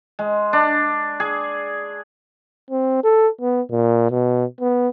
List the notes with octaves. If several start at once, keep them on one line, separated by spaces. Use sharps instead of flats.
G#3
D4
G#4
C4
A4
B3
A#2
B2
B3